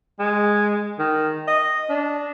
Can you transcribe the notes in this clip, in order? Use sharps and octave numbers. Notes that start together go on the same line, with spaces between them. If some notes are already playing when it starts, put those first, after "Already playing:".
G#3
D#3
D#5
D4